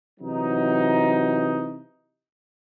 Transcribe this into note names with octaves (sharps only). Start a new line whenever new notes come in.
C3 E3 F#3 D#4